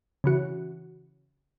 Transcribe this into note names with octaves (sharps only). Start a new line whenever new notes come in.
C#3 E3 F#4